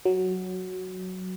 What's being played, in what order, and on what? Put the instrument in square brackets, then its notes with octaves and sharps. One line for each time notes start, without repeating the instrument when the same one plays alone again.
[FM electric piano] F#3